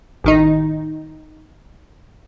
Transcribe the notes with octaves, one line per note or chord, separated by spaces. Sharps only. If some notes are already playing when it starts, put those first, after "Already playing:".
A1 D#3 D#4